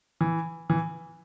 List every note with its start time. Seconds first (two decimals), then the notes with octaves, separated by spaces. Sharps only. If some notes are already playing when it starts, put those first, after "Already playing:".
0.21 E3
0.70 E3